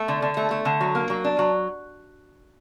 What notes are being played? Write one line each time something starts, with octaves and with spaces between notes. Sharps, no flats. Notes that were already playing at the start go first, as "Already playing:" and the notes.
Already playing: A3
D3
D3
A3
A3
D3
F#3
A#3
F#3
D4
F#3